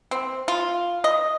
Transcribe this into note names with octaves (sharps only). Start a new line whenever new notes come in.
C4
F4
D#5